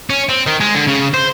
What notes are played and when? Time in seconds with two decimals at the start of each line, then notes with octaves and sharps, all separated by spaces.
0.10 C#4
0.29 C4
0.47 D#3
0.61 G#3
0.75 D3
0.87 C#3
1.14 C5